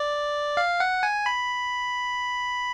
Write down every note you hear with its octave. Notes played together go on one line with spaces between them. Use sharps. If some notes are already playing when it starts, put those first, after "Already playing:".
Already playing: D5
F5
F#5
G#5
B5